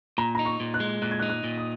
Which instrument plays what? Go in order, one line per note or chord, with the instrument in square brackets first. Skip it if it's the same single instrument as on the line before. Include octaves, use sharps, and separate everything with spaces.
[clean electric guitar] A#2 [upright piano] A#5
[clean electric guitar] D#4 [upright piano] A#5
[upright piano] C#6
[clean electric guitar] A#2
[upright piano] F#6
[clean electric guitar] G#3
[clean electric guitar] A#2 [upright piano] F#6
[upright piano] G#6
F#6
[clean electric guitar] D#4
[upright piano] F#6
[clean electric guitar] A#2
[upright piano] D#6